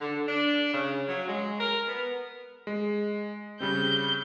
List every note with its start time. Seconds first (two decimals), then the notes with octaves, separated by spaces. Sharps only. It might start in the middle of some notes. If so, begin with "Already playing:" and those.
0.01 D3
0.27 D4
0.74 C#3
1.08 F#3
1.28 G#3
1.60 A#4
1.88 B3
2.67 G#3
3.60 C#3 G3 C4 G6